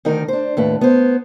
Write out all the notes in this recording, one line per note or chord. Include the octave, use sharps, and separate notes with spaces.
D2 D#3 D#4 A#4
D4 C5
D#2 A2 B4
B3 C5